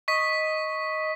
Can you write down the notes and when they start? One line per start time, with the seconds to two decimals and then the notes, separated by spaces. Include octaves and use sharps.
0.08 D#5 C#6 B6